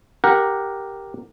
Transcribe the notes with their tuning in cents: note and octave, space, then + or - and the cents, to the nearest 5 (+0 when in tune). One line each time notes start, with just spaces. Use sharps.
G4 +0 A#4 +0 F#5 -15